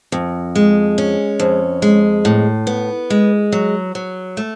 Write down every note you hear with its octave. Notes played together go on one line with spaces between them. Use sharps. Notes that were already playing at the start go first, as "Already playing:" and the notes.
F2
G#3
C#4
F2
G#3
A2
B3
G#3
F#3
F#3
A3